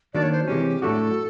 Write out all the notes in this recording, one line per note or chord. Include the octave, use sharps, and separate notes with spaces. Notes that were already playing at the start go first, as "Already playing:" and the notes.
D#3 F#3 A#3 D4 D5
C#5
C5
C3 E3 G#3 C#4 G4
A2 F#3 A3 D4 F#4 A4